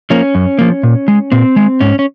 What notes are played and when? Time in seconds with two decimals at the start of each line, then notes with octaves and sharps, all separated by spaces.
0.10 F3 A#3 C#4
0.35 F#2
0.59 F3 A#3
0.83 A#2
1.08 G#3
1.32 A#2 C4
1.56 G#3
1.81 G#2 C#4
1.99 C#4